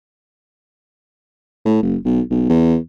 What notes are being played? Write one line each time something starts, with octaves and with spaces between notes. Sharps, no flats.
A2
F#1
B1
B1
E2